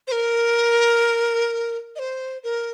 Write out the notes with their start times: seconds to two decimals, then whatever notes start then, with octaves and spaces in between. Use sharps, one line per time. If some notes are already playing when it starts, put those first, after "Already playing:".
0.07 C5
0.12 A#4
1.96 D#5
1.99 C5
2.44 A#4